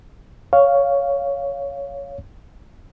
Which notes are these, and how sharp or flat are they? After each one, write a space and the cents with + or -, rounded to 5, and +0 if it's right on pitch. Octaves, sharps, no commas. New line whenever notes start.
C#5 +10 F5 +0